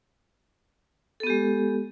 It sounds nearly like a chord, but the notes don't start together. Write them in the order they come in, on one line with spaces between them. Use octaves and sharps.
A4 B3 G4 G#3